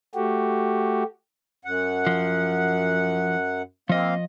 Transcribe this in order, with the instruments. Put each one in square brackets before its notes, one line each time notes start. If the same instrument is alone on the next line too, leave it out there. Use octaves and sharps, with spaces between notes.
[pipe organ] A3 F#4 G4
[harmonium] F#2 F#5
[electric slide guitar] F3
[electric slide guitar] F3 D#5 [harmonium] A#3 C4 F5